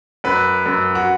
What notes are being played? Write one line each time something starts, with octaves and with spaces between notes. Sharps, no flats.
F#2 B4
F#2
F#4